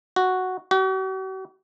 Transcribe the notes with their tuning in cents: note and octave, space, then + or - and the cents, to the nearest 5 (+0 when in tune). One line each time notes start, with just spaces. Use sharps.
F#4 +0
F#4 +45